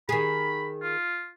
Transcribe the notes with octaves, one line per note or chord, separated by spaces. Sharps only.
D#3 G#4 B5
F4